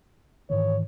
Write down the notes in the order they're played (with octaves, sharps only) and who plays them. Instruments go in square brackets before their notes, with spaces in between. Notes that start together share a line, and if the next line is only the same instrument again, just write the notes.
[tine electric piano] G#2 D#3 E3 [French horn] C#5